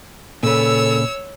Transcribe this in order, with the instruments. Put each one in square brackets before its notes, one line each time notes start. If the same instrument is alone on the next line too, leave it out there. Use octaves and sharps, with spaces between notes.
[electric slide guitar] A#2 C#3 B4 [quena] A4 [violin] C#5 E6